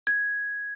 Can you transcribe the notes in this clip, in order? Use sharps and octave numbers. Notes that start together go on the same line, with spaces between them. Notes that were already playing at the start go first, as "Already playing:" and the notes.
G#6